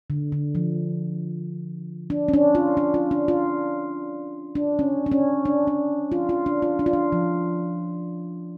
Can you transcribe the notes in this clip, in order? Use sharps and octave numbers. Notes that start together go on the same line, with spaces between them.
D3
D3
F3
D4
C#4
D4
F4
D4
F4
D4
F4
D4
C#4
D4
C#4
D4
D4
F4
F4
D4
F4
D4
F4
D4
F3